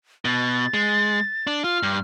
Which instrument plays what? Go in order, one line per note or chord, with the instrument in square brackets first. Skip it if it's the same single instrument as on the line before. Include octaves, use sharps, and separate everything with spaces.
[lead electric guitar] B2 [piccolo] A6
[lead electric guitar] G#3
D4
[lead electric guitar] F4 [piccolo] F6
[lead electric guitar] G2